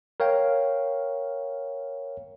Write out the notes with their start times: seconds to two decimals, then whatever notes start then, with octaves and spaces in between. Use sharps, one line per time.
0.20 A#4 C#5 F5 G5